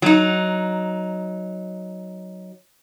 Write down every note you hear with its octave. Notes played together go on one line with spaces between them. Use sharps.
F#3 D#4